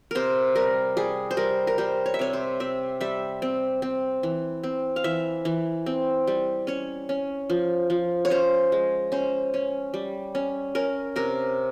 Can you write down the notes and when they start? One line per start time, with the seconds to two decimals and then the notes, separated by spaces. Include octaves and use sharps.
0.11 C3 A#4 C5
0.55 G3 A#4
0.97 G3 G#4
1.31 C5
1.37 G3 A#4
1.67 A#4
1.78 G3 C5
2.06 C#5
2.14 E5
2.19 C3 C#5
2.33 C5
2.60 C4 E5
3.01 G3 E5
3.42 C4
3.82 C4
4.23 E3
4.63 C4
4.96 F5
5.04 E3 E5
5.45 E3
5.86 C4
6.27 G3
6.67 C#4 C#5
7.09 C#4
7.50 F3
7.90 F3
8.25 C#5
8.30 C#4 C5
8.72 G#3
9.12 C#4 C5
9.54 C#4
9.94 G3
10.35 C#4
10.75 C#4 A#4
11.16 C3 A#4